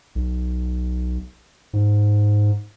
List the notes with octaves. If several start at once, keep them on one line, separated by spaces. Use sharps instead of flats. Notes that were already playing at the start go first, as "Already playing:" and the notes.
B1
G#2